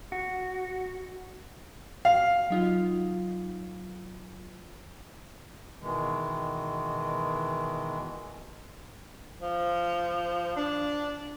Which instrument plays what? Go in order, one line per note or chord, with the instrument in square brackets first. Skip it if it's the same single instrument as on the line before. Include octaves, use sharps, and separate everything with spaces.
[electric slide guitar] F#4
[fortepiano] F5
[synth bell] F#3 D#4 F4
[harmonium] B2 D#3 E3 G#3
[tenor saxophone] F3
D4